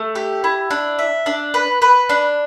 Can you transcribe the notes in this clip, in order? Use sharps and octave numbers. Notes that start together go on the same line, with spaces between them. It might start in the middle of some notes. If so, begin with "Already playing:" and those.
Already playing: A3
G4
E4
D4
E5
D4
B4
B4
D4